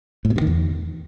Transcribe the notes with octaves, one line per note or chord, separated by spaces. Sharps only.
A2
B2
G2
D#3
E2